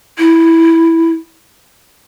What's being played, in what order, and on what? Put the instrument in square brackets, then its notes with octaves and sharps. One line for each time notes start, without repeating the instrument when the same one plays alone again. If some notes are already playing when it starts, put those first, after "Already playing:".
[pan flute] E4